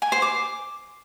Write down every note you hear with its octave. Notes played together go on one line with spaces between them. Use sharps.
G#5
C5
D6